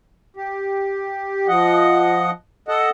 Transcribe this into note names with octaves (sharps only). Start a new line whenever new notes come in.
G4
F3 D#5 F#5
A4 D#5 F#5